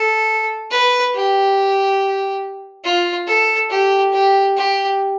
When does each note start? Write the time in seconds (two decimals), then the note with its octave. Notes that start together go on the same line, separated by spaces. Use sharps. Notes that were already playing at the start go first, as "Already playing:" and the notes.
Already playing: A4
0.71 B4
1.14 G4
2.84 F4
3.27 A4
3.70 G4
4.13 G4
4.56 G4